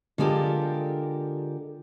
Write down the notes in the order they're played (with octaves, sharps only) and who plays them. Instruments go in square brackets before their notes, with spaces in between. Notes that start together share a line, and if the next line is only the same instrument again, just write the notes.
[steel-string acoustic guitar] D3 G#3 F4 G4 A4 A#4